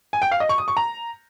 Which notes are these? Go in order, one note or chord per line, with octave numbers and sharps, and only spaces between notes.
G#5
G5
F5
D#5
C#6
D#6
C#6
A#5